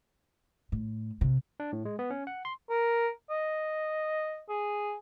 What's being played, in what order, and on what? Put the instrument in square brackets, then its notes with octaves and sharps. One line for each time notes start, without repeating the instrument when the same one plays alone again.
[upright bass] A2
C3
[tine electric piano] D4
A2
G#3
B3
C#4
F#5
C6
[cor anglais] A#4
D#5
G#4